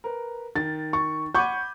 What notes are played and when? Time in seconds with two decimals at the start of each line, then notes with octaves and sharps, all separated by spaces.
0.04 A#4 B4
0.56 D#3 A6
0.93 C#6
1.35 F#5 B5 C#6 D6 G6 G#6 D#7